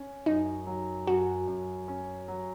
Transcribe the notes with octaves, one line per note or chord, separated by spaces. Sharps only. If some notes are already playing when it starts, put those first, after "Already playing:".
Already playing: C#4
F#2 D#4
F#3
F#2 F#4
F#2
C#4
F#3